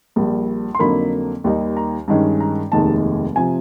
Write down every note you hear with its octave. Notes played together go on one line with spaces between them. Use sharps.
A#1 A#2 G3 A#3
C6
F2 D3 F#3 A#3 D#4 B5
D#2 D#3 G3 A#3 D#4
A#5
G2 D#3 G#3 C#4
A#5
F1 D#2 D#3 G#3 A5
C3 F3 G#5